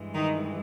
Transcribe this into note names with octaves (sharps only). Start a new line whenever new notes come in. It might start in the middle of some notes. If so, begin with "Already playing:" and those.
Already playing: G2 E3 G#3
D#3 D#4